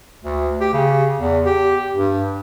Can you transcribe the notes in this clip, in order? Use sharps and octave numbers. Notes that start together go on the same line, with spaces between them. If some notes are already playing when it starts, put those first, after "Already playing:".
D2
G4
C#3
E2
G4
G2